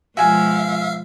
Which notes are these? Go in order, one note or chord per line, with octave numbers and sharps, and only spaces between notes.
B2 F3 G#3 F#4 E5 F5 G#5